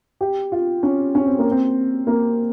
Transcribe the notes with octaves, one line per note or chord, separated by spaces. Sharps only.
G4
F4
C#4
C#4
C4
A#3
C4
A#3